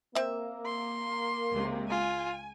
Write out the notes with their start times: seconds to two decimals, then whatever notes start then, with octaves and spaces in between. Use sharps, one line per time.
0.15 A#3 C4 E5
0.66 C6
1.53 C#2 C3
1.90 F4 G#5